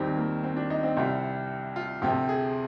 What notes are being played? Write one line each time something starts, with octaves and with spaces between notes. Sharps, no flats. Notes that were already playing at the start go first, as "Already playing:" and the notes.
Already playing: D#2 D#3 G3 C4
A#3
C4
D4
D#4
C4
C2 C3 G3
F4
D2 C3 F3 G4
G#4